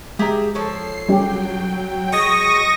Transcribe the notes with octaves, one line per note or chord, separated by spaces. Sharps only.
G#3 G4 G#4 E5 A#5
F3 A4 C#5 C7
F#3 G3 C#4 G4 G5
G#3 C#6 D#6 A#6